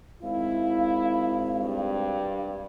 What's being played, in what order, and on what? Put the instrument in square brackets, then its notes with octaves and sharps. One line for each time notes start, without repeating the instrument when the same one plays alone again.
[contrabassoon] G#1 [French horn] E4 [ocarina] F5
[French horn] G2